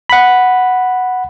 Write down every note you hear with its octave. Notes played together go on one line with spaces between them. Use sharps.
F#5 B5